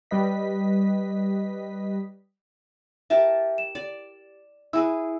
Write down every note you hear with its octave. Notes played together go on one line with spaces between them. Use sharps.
G3 B4 D#5 B6
G4 A#4 E5 A5
E7
D5
E4 G#4 B4 E6